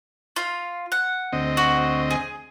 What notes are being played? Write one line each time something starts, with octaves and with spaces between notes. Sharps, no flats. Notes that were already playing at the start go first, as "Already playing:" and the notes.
F4 F5
F#5
D2 C4 D#5
F#4
G#4